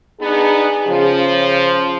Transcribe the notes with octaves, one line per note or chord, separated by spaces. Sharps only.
B3 D4 D#4 G#4
C#3 F3